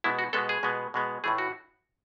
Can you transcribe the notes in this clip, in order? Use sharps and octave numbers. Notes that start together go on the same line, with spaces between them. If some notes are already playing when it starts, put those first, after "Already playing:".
B2 G#3 B3 E4
F#4
B2 G#3 B3 A4
G#4
B2 G#3 B3
B2 G#3 B3
A2 E3 A3 G#4
F#4